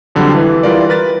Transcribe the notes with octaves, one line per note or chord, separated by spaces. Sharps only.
F2 D3 F#3 G3
E3 B4
E3 G3 F4 A#4 D5
A#4 B4 A6